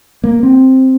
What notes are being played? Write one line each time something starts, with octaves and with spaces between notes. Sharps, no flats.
A#3
C4